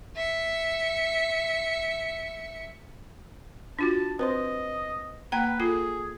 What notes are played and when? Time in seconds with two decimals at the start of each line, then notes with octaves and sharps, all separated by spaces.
0.16 E5 C#7
3.79 D4 F4 F#4 A5
4.19 C4 B4 C5 D#5 C6
5.32 A#3 B4 F#5 G5 A#5
5.60 F4 G#4 A4 C7